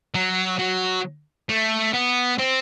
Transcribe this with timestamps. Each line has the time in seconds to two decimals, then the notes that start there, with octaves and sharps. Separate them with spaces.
0.14 F#3
0.59 F#3
1.49 A3
1.93 B3
2.38 C4